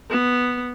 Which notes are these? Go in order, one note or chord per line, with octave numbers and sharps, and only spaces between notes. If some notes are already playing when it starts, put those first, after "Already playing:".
B3